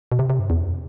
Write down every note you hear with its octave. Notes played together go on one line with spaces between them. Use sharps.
B2
C3
C3
G2
E2
F2